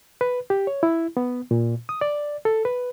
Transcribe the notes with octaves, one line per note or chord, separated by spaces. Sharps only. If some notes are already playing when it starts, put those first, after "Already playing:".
B4
G4
C#5
E4
B3
A#2
D#6
D5
A4
B4